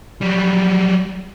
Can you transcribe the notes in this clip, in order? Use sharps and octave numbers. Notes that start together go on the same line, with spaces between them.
F#3 G3